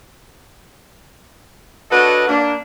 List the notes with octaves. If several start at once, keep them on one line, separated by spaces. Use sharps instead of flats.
D4 F#4 A4 B4 C#5 D#5
A#3 D4